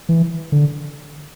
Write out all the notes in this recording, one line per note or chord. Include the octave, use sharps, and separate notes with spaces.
E3
D3